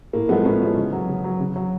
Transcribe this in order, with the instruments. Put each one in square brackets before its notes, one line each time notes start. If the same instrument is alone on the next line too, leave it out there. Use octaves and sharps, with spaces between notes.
[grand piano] A2 A#3
F3 G#3 A3 B3
A2 B3 C#4
F3 G#3
C#3
F#3
C#3
F#3
C#3
F#3